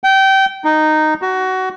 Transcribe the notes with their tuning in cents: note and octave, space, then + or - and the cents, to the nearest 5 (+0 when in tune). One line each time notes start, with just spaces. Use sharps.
G5 -25
D#4 -10
F#4 +20